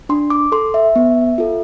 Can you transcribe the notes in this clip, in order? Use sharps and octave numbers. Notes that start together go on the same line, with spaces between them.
D4 C6
D6
A4 C6
E5
B3
F4 A4